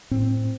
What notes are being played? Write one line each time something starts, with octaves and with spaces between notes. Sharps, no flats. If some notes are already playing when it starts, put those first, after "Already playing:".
A2 C4